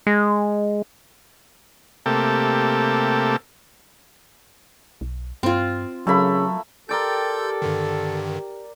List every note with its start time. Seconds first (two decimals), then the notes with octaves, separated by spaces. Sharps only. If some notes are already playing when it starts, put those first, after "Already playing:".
0.07 G#3
2.06 C3 A3 A#3 G4 A4
5.01 B1
5.43 G2 C4 F4
6.07 C#3 F#3 A3 A#3 B5
6.89 G4 A4 A#4 D5 G5 C6 E6 G6
7.62 G2 D3 D#3